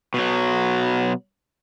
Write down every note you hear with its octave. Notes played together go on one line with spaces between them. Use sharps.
B2 F#3